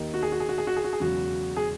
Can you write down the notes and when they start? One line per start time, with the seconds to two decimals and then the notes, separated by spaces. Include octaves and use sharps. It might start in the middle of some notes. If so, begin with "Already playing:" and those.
Already playing: D#2 D#3 A#3 D#4
0.14 F#4
0.23 G#4
0.32 F#4
0.40 G#4
0.49 F#4
0.58 G#4
0.67 F#4
0.76 G#4
0.84 F#4
0.93 G#4
1.00 E1 E2 C#3 F#3 F#4
1.56 G#4